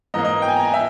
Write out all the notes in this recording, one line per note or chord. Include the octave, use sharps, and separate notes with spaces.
G#2 E3 A#3 D#5
D#5
G5
G#5
A#5
G#5
E5